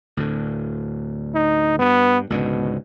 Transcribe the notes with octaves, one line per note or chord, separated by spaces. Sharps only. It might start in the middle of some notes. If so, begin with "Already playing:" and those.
D2 A2 D3
D#4
G2 B3
C#2 G#2 B2 D3